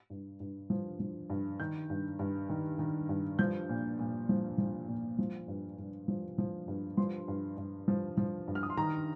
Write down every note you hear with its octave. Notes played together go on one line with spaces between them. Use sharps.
G2
G2
F3
F3
G2
D#3 G6
G2
G2
D#3
D#3
G2
F3 G6
A#2
A#2
F3
F3
A#2
F3
G2
G2
F3
F3
G2
F3 C6
G2
G2
F3
F3
G2
F6
D#6
C6
D#3 A#5